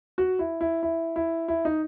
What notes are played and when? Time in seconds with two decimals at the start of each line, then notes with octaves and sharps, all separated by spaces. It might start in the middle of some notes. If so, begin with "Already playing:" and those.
0.18 F#4
0.39 E4
0.61 E4
0.83 E4
1.16 E4
1.48 E4
1.65 D#4